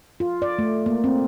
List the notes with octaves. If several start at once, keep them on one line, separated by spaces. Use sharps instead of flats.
F4
D5
A3
A#3
C4